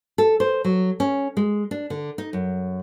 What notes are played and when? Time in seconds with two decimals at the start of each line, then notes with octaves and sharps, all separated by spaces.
0.18 A4
0.40 C5
0.65 F#3
1.00 C#4
1.37 G#3
1.71 D4
1.90 D3
2.18 D#4
2.33 F#2